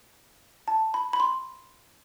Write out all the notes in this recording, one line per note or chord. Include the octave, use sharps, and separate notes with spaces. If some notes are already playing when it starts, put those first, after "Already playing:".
A5
B5
B5
C6